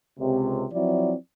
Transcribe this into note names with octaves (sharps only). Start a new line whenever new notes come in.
C#2 C3
F3 F#3 C4 E4 D5